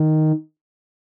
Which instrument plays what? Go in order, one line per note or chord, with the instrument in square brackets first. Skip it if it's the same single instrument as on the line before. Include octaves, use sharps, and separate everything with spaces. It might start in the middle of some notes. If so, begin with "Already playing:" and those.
Already playing: [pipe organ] D#3